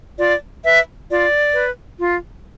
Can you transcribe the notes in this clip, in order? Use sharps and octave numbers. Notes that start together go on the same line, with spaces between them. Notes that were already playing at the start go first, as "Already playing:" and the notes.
F4 D5
B4 E5
F4 D5
B4
F4